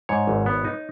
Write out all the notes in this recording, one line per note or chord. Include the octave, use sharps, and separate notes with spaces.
G#2 C#5
G#1
B3
D#4